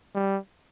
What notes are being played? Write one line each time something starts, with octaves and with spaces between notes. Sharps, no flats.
G3